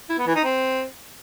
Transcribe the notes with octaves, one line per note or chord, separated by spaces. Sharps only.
E4
B3
E3
D#4
C4